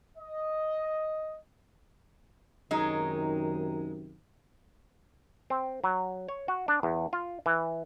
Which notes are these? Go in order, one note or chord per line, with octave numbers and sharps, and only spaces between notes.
D#5
F#2 C3 D#3 F#3 G#3 D#4
C4
F#3
C#5
F#4
D4
E2
F4
E3